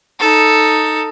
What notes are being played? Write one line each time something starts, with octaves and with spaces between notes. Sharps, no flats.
D#4 A4